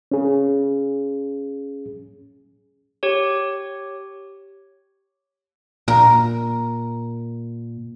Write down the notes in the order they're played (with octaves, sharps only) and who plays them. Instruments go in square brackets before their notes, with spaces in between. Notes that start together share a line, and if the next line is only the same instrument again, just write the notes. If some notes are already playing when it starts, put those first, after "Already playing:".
[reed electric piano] C#4 G#4
[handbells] G4 C#5
[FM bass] A#2 [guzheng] A#4